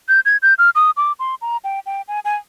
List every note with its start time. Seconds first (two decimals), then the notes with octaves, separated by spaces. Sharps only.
0.09 G6
0.25 G#6
0.42 G6
0.58 F6
0.75 D#6
0.97 D6
1.19 C6
1.42 A#5
1.64 G5
1.86 G5
2.08 G#5
2.25 G#5